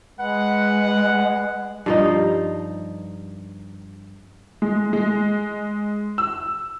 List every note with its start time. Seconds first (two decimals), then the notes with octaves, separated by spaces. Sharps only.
0.19 G#3 B4 F#5
1.86 G2 F3 D#4
4.62 G#3
4.93 G#3
6.18 E6